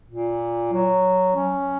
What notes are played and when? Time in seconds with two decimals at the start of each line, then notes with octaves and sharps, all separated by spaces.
0.09 A#2
0.73 F#3
1.36 C#4